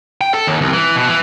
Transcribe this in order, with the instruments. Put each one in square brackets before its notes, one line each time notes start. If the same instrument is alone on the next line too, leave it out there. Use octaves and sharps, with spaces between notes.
[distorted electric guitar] G5
A4
D#2
C2
E3
B2
E3